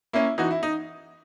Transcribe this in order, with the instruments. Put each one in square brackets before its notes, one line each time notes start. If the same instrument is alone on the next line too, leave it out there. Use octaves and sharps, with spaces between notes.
[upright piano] A#3 C#4 E4
E3 D#4 F#4
E4
D#4